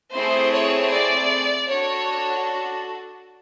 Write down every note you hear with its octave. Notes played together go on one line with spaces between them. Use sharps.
A3 C4 E4 G#4 C5
C#5
D5
D4 F#4 A4 C#5